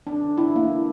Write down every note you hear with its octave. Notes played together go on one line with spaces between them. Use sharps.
D4
E4
A#3